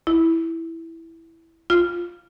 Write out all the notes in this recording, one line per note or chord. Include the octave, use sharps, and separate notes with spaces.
E4
F4